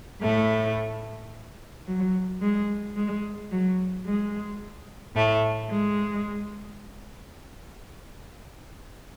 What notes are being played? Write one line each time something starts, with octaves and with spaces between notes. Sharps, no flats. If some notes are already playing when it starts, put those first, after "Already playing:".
A2 A3
F#3
G#3
G#3
F#3
G#3
A2 A3
G#3